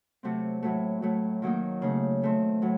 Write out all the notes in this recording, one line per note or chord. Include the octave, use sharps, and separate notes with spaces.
C3 F#3 A3 C4
A2 F#3 A3
A2 F#3 A3
D#3 F#3 A#3 D#4
C#3 A3 D#4
D#3 A3 C4
A2 F#3